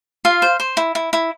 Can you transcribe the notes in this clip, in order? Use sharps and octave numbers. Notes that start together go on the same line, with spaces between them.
F4 F5
C5
C5
E4
E4
E4